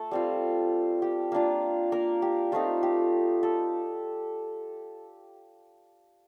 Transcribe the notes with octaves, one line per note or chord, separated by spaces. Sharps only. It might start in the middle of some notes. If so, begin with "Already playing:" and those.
Already playing: A3 A4
G3 C4 F4
G4
A#3 D4 F4
A#3 A#4
G4
A3 C4 D#4 F4
G4
A4